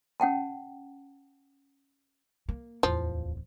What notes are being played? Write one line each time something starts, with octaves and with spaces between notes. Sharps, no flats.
C#4 F#5 G5 A5
A#3
D1 E2 F3